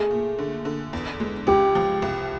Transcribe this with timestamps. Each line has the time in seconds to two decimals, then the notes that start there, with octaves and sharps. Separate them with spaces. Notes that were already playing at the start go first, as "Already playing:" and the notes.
Already playing: A3 G#4
0.11 A#2
0.39 D3
0.65 D3
0.93 E2
1.20 G#3
1.47 C#2 G4
1.75 F3
2.02 C2